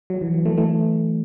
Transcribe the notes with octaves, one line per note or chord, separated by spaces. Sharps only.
F#3
E3
F#3
E3 A3
E3 A3